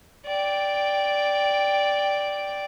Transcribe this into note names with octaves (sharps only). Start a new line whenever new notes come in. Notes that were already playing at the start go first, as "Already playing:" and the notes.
D5 G5